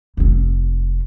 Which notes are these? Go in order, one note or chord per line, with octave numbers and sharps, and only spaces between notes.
F1 C4